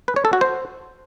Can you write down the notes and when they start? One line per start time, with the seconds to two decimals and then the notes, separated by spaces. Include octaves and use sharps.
0.08 B4
0.16 C#5
0.25 A4
0.33 F#4
0.41 C5